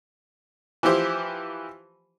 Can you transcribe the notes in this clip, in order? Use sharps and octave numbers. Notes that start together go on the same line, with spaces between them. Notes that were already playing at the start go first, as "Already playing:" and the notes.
E3 F3 E4 G4 C5